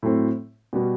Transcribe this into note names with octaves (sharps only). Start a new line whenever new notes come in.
A2 F#3 A3 C4
B2 G3 B3 F#4